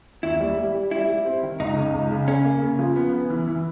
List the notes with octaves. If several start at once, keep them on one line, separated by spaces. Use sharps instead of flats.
D#2 E4
G3
G3
G3
G3 E4
G3
C4
D#3
C#2 D#4
C#3
C#2
C#3
C#3 C#4
A#3
C#3
F3
B3
B3
E3
E3